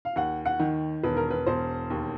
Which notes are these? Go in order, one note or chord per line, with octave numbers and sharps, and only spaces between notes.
F5
D#2 F#5
F#5
D#3
E1 B4
A#4
B4
E1 C5
D#2